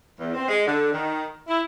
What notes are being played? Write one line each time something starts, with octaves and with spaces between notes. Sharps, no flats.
E2
C4
G#3
D3
D#3
E4